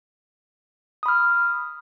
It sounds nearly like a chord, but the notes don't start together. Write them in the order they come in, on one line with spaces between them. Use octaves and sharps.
D#6 B5 F6